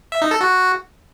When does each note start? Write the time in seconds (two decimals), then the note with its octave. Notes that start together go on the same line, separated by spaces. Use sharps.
0.12 E5
0.22 D#4
0.31 A4
0.41 F#4